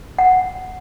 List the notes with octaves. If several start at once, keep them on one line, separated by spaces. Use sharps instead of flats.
F#5